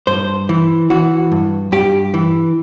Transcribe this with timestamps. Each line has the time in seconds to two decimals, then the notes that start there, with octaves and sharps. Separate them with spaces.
0.07 G2 C5
0.49 E3
0.90 E3 F#4
1.32 G2
1.72 G2 G4
2.14 E3